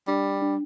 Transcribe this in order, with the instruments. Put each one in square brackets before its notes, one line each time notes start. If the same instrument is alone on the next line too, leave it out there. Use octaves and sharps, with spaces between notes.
[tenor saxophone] G3 [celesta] D4
[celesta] D4